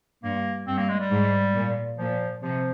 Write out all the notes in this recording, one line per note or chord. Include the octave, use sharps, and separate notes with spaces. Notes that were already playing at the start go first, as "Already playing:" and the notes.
G2 A#3
G2 C4
A#3
G#3
G3
G#2
A#2
A#2 F3
C3 F3